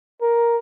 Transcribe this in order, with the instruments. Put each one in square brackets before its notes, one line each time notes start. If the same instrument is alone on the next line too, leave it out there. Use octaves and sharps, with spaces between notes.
[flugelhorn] A#4